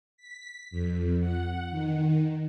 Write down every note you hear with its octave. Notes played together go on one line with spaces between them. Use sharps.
B6
F2
F#5
D#3